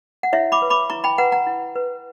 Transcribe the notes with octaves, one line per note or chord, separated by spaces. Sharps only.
F#5
E4 C#5 E5
B5 D6
B4
B5 D6
E4 A#5 C#6
G5 B5
B4 F#5 A#5
F#5 A#5
E4
B4